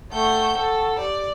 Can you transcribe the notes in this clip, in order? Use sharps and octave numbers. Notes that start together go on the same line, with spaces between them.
A3 F#5 G5 C#6 G6
A4
G4 D5